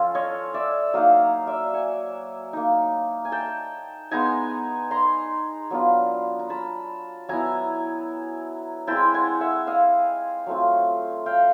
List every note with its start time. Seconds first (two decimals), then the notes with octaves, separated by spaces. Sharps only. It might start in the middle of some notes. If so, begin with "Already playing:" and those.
Already playing: F3 C#4 F4 A4
0.15 C#5 D#5
0.54 D5 E5
0.94 F#3 A#3 D#4 D#5 F5
1.47 D5 E5
1.73 F#5 G#5
2.53 A#3 D#4
3.25 G#5
3.32 G5 A5
4.11 G#3 B3 D#4 G#5 A#5
4.91 A#5 C6
5.71 F#3 B3 D4 F4
6.39 A#5
6.50 A5 B5
7.29 F#3 B3 E4 G#5 A#5
8.87 G#3 C4 E4 G5 A5
9.14 F#5 G#5
9.40 E5 F#5
9.67 D#5 F5
10.47 F#3 A3 C4 F4
11.26 F5 G5